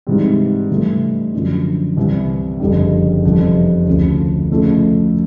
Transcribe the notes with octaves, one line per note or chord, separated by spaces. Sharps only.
G#2 E3 G3 C4
G2 E3 A3
F#2 D3 F3
C2 C3 E3
F#1 F2 D3 G3
F1 F2 C#3 E3 G3
D2 C#3 F3
F2 C#3 F3 A3